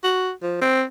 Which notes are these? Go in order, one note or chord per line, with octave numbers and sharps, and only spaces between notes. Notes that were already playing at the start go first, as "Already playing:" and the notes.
F#4
F3
C4